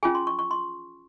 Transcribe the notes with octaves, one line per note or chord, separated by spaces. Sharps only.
C#4 F4 G#4 G#5
C6
C#6
C#6
C6